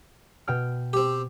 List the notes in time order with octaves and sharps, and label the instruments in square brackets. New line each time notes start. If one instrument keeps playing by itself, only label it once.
[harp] B2 G5 F6
[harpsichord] C4 G4